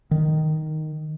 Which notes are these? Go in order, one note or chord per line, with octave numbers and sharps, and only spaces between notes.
D#3